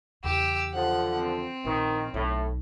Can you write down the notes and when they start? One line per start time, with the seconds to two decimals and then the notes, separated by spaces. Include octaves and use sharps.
0.24 E2 C#3 G4 E6
0.74 D3 F3 F#5
1.16 C4
1.65 A#1 D#3
2.14 B1 A2